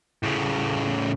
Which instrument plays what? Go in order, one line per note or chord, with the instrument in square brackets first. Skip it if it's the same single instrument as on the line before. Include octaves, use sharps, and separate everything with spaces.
[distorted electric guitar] A2 C#3